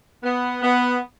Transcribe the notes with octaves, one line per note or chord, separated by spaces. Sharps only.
B3
B3